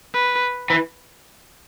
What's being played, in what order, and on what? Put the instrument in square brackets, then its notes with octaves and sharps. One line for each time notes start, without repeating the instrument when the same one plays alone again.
[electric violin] B4
[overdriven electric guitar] E3